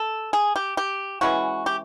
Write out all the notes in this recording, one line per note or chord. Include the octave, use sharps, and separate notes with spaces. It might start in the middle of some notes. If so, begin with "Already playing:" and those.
Already playing: A4
G#4
G4
G4
E3 G#3 C#4 E4 F#4
G4